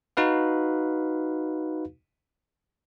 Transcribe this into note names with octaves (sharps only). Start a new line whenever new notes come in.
D#4 F#4 B4 F5